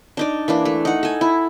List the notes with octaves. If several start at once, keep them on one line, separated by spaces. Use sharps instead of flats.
D4 D#4 D5
E3 A#3 D4
A3
D#4 F#5
A4 G#5
E4